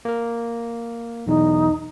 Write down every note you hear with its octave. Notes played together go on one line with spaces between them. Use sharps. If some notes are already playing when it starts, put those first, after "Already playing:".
A#3 A#4
B1 E2 D#4